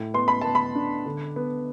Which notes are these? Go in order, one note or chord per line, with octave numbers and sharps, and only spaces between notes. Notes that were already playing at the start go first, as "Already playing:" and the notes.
Already playing: A2
B3 C6
B5
B3 A5
B5
D4
D3
B3